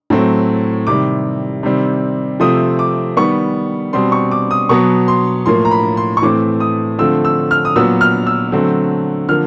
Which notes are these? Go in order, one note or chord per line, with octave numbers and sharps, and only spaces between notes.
A2 F#3 A3 C4
C3 D#3 G3 D6
C3 D#3 G3 C4
C3 F3 A3 C4 D#6
D6
D#3 G3 B3 C#6
B2 G3 C4 C6
C#6
D6
D#6
B2 F#3 B3 C#6
C6
A2 F3 A#3 C6
A#5
B5
C6
C#6
A2 E3 A3 C4 D6
D#6
D3 F3 A3 C4 E6
E6
F6
D#6
A#2 F#3 B3 E6
F6
E6
D3 F#3 A3 C4
D3 F3 A#3 F6